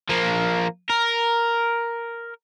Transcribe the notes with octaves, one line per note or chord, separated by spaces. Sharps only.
F3 A#3
A#4